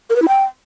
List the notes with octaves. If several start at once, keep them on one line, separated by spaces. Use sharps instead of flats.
A#4
B4
E4
G5